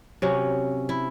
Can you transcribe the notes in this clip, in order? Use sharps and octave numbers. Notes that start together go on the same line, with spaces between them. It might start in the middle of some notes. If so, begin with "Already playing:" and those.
C3 F#3 C#4
E4